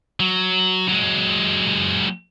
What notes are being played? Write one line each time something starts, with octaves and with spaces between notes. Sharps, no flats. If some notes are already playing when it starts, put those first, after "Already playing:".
F#3
F#3 G#3